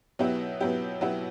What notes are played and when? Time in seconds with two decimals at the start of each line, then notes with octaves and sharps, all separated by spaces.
0.19 B2 F#3 B3 E4 G4
0.60 B2 F#3 B3 E4 G4
1.01 B2 F#3 B3 E4 G4